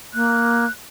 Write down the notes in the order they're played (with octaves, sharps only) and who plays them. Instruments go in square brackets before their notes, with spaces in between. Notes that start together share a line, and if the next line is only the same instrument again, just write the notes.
[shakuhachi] A#3 [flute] F#6